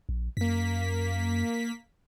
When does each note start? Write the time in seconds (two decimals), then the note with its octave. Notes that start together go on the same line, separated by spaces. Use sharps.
0.09 A#1
0.37 F#2 A#3 B6